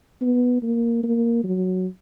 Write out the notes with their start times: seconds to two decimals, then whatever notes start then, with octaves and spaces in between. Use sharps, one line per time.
0.21 B3
0.63 A#3
1.03 A#3
1.44 F#3